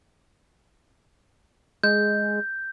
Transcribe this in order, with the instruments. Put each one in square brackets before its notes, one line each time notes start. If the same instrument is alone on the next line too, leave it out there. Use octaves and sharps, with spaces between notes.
[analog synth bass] G#3 [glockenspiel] G6